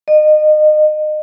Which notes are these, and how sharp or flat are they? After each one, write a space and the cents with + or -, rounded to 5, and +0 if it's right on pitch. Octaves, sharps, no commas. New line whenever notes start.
D#5 -30